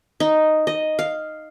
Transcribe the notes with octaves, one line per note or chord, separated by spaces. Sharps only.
D#4
D#5
F5